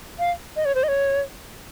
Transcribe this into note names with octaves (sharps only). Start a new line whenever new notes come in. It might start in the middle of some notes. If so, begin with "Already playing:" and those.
F5
D#5
C#5
C5
D#5
C#5